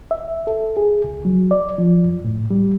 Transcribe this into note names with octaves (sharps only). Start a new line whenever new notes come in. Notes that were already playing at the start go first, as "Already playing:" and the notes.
E5
A4
G#4
C#2
F#3
D5
F3
F#2
A2
G3